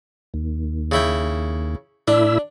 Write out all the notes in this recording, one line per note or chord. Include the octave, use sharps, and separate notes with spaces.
D#2
C#3 E4 G5
A2 D4 E4 E6